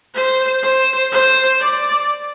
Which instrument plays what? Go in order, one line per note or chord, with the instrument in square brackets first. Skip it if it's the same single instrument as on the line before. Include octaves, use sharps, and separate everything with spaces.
[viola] C5
C5
C5
D5